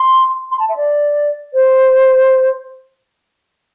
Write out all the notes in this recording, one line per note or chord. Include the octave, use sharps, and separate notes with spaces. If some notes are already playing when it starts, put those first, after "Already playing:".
Already playing: C6
C6
A5
E5
D5
C5